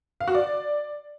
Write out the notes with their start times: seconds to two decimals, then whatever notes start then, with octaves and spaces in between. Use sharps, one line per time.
0.21 F5
0.28 F#4
0.35 D5